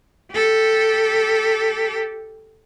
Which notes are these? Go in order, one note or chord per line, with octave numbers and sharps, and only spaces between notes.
G4 A4